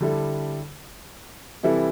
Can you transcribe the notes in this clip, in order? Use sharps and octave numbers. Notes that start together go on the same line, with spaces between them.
D3 G3 E4 A4
C3 E3 G3 E4 A4